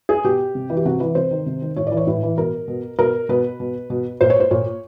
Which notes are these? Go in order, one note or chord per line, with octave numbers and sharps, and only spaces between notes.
G#4
B2 G4
C3
E3
G4
C3 F#4
E3 B4
C3 C5
D#3
C3
D#3
A2 C#5
E3 D5
C#5
A2 B4
E3
B2 A#4
B2
B2 A#4
B2 B4
B2
B2
A#2 C5
C#5
C5
A#2 C#5